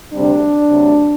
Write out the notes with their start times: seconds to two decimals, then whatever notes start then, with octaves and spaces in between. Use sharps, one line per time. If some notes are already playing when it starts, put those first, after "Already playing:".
0.13 D2 C3 G3 C4 D4
0.70 C3 F#3 A3